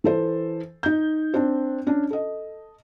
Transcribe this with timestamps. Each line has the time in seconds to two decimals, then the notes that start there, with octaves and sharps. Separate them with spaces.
0.04 E3 A4 C5
0.83 D#4 G6
1.34 C4 D4
1.87 C#4 D4
2.10 A4 D#5